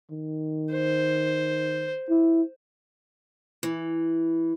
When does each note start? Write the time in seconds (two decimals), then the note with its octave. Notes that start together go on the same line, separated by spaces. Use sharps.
0.11 D#3
0.72 C5
2.10 E4
3.63 E3